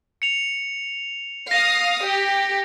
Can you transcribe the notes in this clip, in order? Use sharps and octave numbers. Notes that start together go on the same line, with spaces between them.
C#7 F7
F5 D#6 A#6
G4